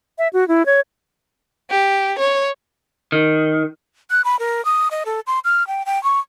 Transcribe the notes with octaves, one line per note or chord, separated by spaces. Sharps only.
E5
F#4
E4
C#5
G4
C#5
D#3
F#6
B5
A#4
D#6
D#5
A4
C6
F6
G5
G5
C#6